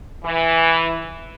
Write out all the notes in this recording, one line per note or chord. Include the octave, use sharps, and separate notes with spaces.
E3